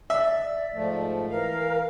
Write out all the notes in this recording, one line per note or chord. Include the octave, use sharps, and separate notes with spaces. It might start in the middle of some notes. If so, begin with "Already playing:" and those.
D5 E5
G#2 F3 A3
E3 A#4 F5